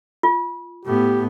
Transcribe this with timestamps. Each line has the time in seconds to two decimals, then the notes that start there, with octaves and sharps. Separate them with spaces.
0.23 F4
0.85 A2 B3 G4